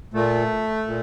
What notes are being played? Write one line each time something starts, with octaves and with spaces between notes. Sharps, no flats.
A#2 A3
A#2